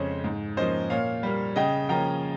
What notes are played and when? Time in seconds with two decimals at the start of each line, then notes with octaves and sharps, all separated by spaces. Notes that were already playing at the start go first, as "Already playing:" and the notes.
Already playing: F2 C#3 G#3 C#4 C5 C#5
0.24 G#2
0.57 F3 A#3 C#4 C5 D#5
0.90 A#2 C#5 F5
1.23 G3 A#3
1.56 C#3 D#5 G5
1.89 F3 A#3 C#4 G5 A#5